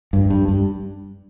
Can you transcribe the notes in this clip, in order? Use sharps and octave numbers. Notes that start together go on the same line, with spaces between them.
G2
G2
G2